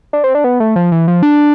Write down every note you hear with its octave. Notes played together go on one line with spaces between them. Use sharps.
D4
C4
D4
B3
A3
F3
E3
F3
D4